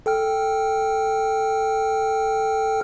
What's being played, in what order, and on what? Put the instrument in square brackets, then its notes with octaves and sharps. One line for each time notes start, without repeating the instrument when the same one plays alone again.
[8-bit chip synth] A4 G5 F6